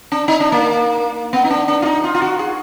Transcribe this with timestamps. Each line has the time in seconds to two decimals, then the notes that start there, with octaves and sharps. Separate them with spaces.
0.12 D4
0.28 D#4
0.40 D4
0.52 A#3
1.33 B3
1.44 D#4
1.50 D4
1.68 D4
1.82 F4
1.85 D#4
2.04 F4
2.15 F4
2.22 F#4
2.39 G#4